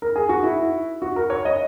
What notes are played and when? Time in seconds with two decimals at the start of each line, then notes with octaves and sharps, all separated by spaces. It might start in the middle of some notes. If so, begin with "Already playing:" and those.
0.02 A#4
0.16 G#4
0.29 F#4
0.43 E4
1.02 F#4
1.16 A#4
1.30 C#5
1.45 D#5